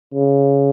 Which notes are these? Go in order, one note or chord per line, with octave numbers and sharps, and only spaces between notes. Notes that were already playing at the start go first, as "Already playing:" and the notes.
C#3